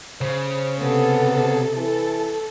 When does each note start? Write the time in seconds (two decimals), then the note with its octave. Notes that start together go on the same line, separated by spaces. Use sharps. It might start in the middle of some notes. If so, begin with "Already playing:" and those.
0.21 C#3 C5
0.81 C3 B3 A4
1.77 E3 A4